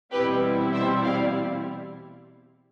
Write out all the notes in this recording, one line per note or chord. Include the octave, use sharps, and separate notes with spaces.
E2 B2 G3 C4 E4 G4 B4
C5 E5
D5 F5